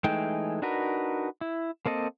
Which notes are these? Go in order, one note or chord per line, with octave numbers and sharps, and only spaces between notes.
E3 G#3 A3 D#4 G5
D4 D#4 F#4 A#4 B4
E4
A#3 C4 A4 D#5